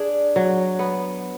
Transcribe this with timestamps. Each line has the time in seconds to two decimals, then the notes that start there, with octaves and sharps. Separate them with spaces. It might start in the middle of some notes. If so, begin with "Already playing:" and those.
Already playing: D4 G#4
0.36 F#3
0.79 B3